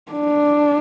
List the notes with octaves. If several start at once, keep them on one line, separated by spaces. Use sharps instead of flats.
D4